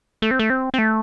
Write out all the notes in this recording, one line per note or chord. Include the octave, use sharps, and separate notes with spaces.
A3
C4
A3
C4
C4
A3